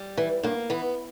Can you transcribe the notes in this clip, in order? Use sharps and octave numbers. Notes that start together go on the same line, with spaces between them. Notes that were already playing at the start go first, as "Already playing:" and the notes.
Already playing: G3
E3
G2 A#3
E3 B3